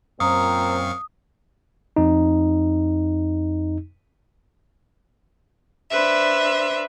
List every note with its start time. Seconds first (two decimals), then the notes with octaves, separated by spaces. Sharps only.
0.20 F#2 A#2 C4 F5 A#5 C#6 D#6
1.96 F2 D#4
5.90 D4 B4 C5 E5